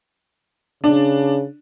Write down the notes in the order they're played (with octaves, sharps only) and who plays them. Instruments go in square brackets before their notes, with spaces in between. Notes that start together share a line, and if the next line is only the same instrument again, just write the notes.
[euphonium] C#3 [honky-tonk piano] D4